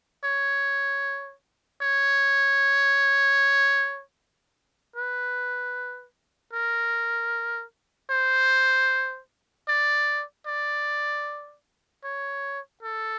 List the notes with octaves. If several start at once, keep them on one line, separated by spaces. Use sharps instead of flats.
C#5
C#5
B4
A#4
C5
D5
D5
C#5
A4